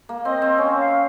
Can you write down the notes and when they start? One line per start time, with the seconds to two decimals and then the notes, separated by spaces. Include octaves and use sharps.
0.09 A#3
0.25 C4 D#5
0.42 C4
0.58 C#4 C#5
0.80 F5